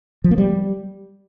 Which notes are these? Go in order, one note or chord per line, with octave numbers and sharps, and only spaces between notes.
F3
A#3
G3